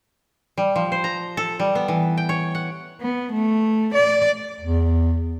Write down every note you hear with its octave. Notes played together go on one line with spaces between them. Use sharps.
G3
F3
C5
A#5
A4
G3
B3
E3
G5
C#5
F#5
B3
A3
D5
E2